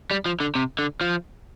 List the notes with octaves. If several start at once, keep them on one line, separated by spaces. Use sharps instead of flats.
G3
F3
D3
C3
D3
F3